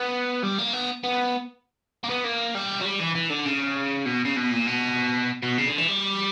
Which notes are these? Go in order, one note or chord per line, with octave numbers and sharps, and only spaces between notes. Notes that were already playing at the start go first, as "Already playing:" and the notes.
Already playing: B3
G3
A#3
B3
B3
A#3
B3
A#3
G3
F#3
G3
E3
E3
D3
C#3
B2
C#3
B2
A#2
B2
B2
C#3
D3
E3
G3